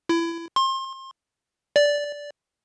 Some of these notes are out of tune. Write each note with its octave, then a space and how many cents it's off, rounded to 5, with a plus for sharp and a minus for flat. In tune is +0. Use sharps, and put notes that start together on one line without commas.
E4 +25
C6 +30
D5 -10